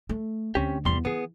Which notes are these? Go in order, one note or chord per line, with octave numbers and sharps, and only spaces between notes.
A3
D2 C4 C#4 G4
E2 C3 G3 B3 C6
E3 B3 G#4